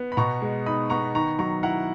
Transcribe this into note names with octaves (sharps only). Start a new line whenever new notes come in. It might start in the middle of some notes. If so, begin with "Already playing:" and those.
Already playing: B3
B5
B2 A#5 C#6
G#3
D#4 B5 D#6
B3 A#5 C#6
D#3 A#5 C#6
F#3 A#5 C#6
E4 F#5 A#5